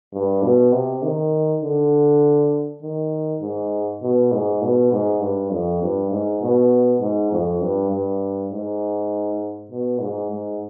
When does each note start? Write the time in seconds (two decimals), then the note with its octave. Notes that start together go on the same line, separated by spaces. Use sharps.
0.13 G2
0.43 B2
0.72 C3
1.02 D#3
1.63 D3
2.82 D#3
3.42 G#2
4.02 B2
4.32 G#2
4.62 B2
4.92 G#2
5.21 G2
5.51 F2
5.82 G2
6.11 G#2
6.42 B2
7.01 G#2
7.31 F2
7.61 G2
7.91 G2
8.51 G#2
9.71 B2
10.01 G#2
10.30 G#2